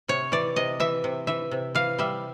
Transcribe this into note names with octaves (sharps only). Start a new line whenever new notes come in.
C3 C#5
E3 D5
C3 D#5
E3 E5
C3
E3 E5
C3
E3 F5
G3 E5